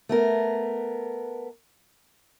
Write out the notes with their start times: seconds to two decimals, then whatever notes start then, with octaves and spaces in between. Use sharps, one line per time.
0.09 A3 B3 A#4